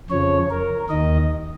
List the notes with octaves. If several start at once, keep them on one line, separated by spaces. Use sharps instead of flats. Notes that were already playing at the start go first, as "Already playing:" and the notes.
F2 C#3 F3 C#5
A#4
D#2 D#3 D#5